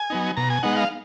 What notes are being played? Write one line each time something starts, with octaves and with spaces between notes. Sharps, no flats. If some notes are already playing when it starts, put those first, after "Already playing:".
Already playing: G#5
F#3 B3 D#4
B2 A#5
G#5
G#3 B3 D#4 F#5
F5